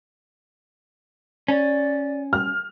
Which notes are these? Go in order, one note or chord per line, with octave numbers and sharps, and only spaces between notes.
C#4 D5
F6